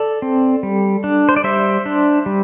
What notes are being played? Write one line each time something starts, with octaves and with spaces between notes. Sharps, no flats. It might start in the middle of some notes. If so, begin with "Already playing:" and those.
Already playing: A4 D5
C4
G3
D4
C5
D5
G3 C5 E5
D4
G3